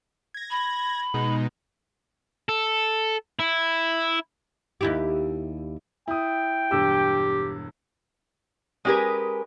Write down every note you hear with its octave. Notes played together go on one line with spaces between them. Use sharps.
G#6 A#6
B5
B2 G#3 D#4
A4
E4
D#2 E4 G4
E4 G5 D#6
E1 G2 G4 E6
G#3 C#4 G4 G#4 A#4 B4